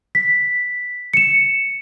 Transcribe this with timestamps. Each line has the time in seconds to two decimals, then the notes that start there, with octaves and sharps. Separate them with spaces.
0.15 B6
1.14 C#7 E7